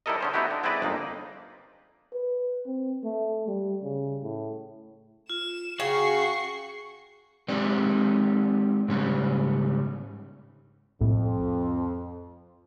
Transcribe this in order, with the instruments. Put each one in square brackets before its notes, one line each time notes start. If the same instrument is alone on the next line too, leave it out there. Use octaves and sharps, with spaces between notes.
[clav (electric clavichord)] G3 D#4 E4 A4 A#4 D#5
D3 C#4 C5
A3 B3 D#4 E4 F#4 G4
D3
G#3 C4 E4 B4 D5 D#5
G1 F2 A#3 D#4
[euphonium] B4
C4
A3
G3
C#3
A2
[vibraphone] F4 [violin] E7
[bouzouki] C#3 [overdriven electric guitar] F#4 [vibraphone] G#4 G5 [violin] C#6 C7
[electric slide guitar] G#3 C4 D#4 G4 B4 D5
G#2 C#3 G3 C#4
[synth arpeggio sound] C2 A2 [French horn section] F2